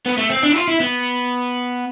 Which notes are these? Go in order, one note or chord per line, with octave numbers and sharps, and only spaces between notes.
B3
A3
C4
D4
E4
F4
E4
B3